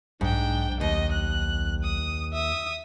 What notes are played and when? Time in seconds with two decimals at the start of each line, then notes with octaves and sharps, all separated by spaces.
0.21 B1 G#2 D4 G5
0.81 D#2 D#5
1.12 F#6
1.84 D#6
2.33 E5 D#6